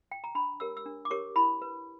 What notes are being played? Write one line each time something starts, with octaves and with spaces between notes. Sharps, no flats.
G5
A#5
D4 B5
G4 A#4 C#5 E6
E6
D4
D6
G4 A#4 C#5 C#6
E4 B5
B4